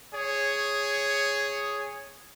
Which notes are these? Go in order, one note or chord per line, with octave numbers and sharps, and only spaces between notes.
G#4 C#5